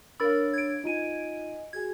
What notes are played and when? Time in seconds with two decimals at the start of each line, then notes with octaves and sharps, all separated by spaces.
0.20 D4 A#4 C#5 F5 B5 E6 A6
0.53 G#6 D7
0.84 D#4 F4 D#5 G#5 D#7
1.73 F#4 G#4 G#5 G#6